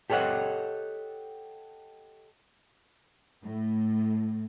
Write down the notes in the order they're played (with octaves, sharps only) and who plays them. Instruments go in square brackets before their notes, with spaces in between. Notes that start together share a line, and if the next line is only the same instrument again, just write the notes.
[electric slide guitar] G4 A4 C#5 D#5 F#5
[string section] A2